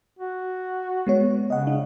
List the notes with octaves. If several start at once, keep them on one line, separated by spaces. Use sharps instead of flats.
F#4
G#3 B3 C#5
C#3 D#5 F#5
D4